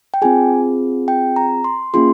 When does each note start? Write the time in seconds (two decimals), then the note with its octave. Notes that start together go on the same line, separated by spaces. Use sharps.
0.14 G5
0.22 C4 F4 G#4 G#5
1.08 G5
1.36 A#5
1.64 C6
1.93 A#3 C#4 F4 G#4 C6